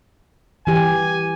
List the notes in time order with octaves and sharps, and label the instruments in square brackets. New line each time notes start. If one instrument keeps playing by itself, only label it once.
[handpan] E3 G4 [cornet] G#5